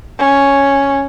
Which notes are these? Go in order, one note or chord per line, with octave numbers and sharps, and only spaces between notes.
C#4